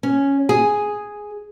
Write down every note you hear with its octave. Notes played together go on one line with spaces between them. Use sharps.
C#4
G#4